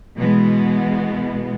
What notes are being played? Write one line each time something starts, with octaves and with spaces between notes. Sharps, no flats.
B2 E3 G#3 B3